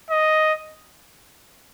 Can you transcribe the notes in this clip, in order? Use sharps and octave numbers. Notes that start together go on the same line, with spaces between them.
D#5